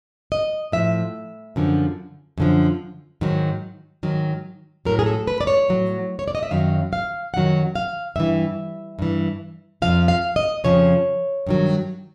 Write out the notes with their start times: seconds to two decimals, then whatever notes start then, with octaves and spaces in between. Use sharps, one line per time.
0.32 D#5
0.72 A2 F3 E5
1.56 F#2 D3 F3
2.38 F#2 D3 F3
3.21 G#2 D#3 F#3
4.03 G#2 D#3 F#3
4.85 A2 F#3 A#4
4.99 G#4
5.06 A4
5.27 B4
5.41 D5
5.47 C#5
5.68 A2 F#3
6.19 C#5
6.28 D5
6.35 D#5
6.43 E5
6.51 F#2 D#3 F#3 F5
6.93 F5
7.34 F#2 D#3 F#3 F#5
7.76 F5
8.16 G2 E3 E5
8.99 G2 E3
9.82 C#3 F3 F5
9.85 F2
10.08 F5
10.36 D#5
10.64 F2 C#3 F3 C#5
11.47 G2 D#3 F#3